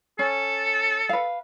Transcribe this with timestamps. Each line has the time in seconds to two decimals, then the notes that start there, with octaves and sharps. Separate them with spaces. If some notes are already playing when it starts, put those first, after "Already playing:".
0.19 C#4 A4
1.09 B4 F5